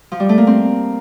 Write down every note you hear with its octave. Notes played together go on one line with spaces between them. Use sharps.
F3
G3
A3
A#3
C4